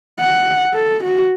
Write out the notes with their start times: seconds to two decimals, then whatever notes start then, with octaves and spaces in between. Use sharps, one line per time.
0.20 F#5
0.74 A4
1.03 F#4